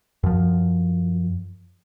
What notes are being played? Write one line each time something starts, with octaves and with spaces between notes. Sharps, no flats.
F#2 F3